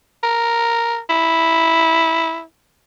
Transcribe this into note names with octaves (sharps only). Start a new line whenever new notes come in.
A#4
E4